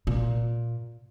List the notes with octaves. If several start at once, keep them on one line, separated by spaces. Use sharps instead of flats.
A#2